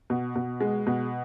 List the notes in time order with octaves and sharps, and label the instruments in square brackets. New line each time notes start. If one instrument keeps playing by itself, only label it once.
[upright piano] B2
B2
G#3
B2